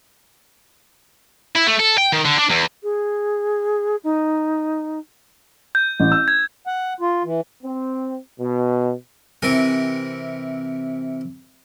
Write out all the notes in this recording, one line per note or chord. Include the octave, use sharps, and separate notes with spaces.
E4
A3
A4
G5
D#3
D3
D4
E2
G#4
D#4
G6
A1
E6
G#6
F#5
F4
E3
C4
B2
C3 E3 A#4 G#5